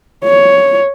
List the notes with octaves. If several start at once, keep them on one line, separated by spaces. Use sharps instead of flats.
C#5